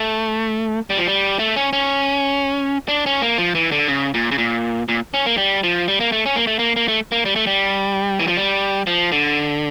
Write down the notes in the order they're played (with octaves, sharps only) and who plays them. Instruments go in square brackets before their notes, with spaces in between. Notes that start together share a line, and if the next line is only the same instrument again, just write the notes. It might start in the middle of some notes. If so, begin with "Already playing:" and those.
Already playing: [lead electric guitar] A3
G3
F3
G3
A3
C#4
C#4
D4
C#4
A#3
F3
E3
D3
C#3
A#2
C#3
A#2
A#2
C#4
A#3
G3
F3
G3
A#3
A3
C#4
A#3
A3
A#3
A#3
A3
A#3
G3
A3
G3
E3
F3
G3
F3
D3